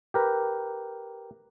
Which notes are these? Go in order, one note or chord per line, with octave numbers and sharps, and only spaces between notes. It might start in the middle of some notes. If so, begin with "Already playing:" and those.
G4 A#4 B4